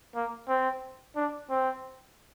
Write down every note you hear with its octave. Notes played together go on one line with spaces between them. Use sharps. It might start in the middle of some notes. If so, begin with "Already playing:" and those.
A#3
C4
D4
C4